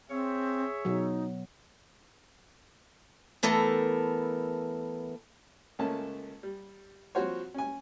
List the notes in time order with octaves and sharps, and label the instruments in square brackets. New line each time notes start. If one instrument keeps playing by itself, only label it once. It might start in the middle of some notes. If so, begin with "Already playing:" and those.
[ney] C4 [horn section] G#4 C#5 E5
[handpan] B2 F#3 [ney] D#4
[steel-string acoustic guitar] E3 A3 B3 A4 A#4
[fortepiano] C#2 A3 A#3 C#4 A5
G3
F3 G3 C4 F#4 C5 C#5
C#4 G#5